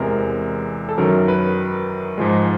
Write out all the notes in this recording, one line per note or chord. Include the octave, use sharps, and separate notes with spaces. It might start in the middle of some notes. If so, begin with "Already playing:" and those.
Already playing: E2 C3 E3 G#3 A#4
A4
F#2 D#3 F#3 A#4
B4
G#2 F3 G#3